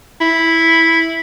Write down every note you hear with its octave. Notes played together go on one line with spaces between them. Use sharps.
E4